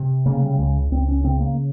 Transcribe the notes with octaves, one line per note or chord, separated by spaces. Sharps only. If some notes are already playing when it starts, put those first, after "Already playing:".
Already playing: C3
C#3 A#3
G3
C#2 G#3
C#2 C4
C#4
C#3 C4
A#3